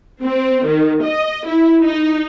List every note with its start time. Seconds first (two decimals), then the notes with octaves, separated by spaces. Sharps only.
0.21 C4
0.66 D#3
1.03 D#5
1.46 E4
1.81 D#4